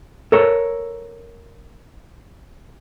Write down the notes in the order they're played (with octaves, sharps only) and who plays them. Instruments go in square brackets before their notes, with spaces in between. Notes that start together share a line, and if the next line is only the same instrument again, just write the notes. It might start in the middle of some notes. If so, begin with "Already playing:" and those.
[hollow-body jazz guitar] A4 A#4 C#5